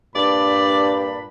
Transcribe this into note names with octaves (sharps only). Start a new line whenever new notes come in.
G2 A#2 D4 D5 B5